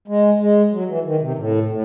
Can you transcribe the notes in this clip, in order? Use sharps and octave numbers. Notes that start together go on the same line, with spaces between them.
G#3
G#3
F#3
E3
D#3
C3
A2
A2